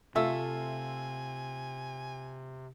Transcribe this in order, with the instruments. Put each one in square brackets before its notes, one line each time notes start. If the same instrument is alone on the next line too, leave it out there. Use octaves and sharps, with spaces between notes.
[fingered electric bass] C3 [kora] A3 [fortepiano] F4 E5 E6 [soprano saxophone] G#5